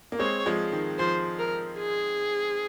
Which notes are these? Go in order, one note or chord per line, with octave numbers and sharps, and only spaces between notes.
A#3
G#3 C4 C#5
F3 G#3
D#3
F3 C5
A#4
G#4